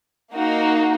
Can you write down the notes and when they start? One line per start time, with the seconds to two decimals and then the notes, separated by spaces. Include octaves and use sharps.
0.32 A#3 D#4 F#4